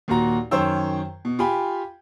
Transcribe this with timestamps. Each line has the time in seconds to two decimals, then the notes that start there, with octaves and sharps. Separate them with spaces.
0.08 D#2 A#2 F#4 A#5
0.51 F#2 D#3 C5 C#5 G5 E6
1.25 B2
1.39 F4 G4 G5 G#5 B5